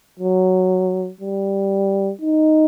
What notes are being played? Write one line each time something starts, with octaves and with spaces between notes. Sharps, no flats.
F#3
G3
D#4